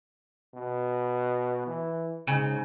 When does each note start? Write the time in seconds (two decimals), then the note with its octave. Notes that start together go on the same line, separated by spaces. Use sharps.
0.55 B2
1.67 E3
2.27 G#2 C#3